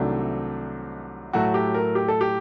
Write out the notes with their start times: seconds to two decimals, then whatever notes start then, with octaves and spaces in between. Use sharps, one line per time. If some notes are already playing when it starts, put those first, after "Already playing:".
Already playing: C2 C3 D#3 F#3 A3 D4
1.33 A2 F#3 A3 F#4
1.54 G4
1.74 A#4
1.95 G4
2.08 A4
2.21 G4